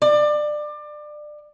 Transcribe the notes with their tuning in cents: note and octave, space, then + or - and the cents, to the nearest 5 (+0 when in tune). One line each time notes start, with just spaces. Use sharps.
D5 +25